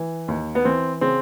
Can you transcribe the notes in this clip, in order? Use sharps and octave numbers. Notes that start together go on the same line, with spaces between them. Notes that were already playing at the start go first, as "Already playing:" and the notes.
Already playing: E3
D#2
B3
E3 C4
C#3 C4